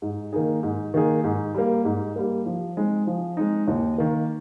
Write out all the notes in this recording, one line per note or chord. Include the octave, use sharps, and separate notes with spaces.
G#2
D#3 A#3 D#4 G#4
G#2
D#3 A#3 D#4 G#4
G#2
G3 A#3
G#2
G3 A#3
F3
G#3 C4 D#4
F3
G#3 C4 D#4
D#2
D#3 A#3